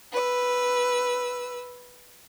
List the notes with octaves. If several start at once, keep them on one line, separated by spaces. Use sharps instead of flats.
B4 E6